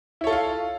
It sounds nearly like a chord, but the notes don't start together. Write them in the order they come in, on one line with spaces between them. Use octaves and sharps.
E4 C#5 A4 F4 F5